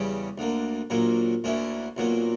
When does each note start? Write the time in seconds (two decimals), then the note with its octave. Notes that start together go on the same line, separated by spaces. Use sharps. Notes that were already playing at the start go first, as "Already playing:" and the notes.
Already playing: E2 C#3 G3 C#4 G4
0.38 D2 D3 A#3
0.90 A#1 A#2 F#3 A#3
1.44 D2 D3 A#3 C#4 E4
1.97 B1 A#2 F#3 A#3